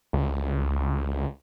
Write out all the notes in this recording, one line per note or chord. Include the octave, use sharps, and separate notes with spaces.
C#2